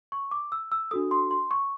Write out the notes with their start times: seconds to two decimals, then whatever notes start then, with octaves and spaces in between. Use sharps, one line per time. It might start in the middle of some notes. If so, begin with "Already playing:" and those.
0.12 C#6
0.31 D6
0.52 E6
0.72 E6
0.91 D4 F#4 A4 D#6
1.11 C6
1.31 C6
1.51 C#6